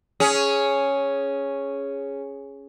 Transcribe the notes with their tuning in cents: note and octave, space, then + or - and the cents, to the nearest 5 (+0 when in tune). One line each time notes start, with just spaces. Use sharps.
C#4 +0 G#4 +0